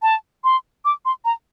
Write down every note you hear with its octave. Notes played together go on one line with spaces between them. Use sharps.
A5
C6
D6
C6
A#5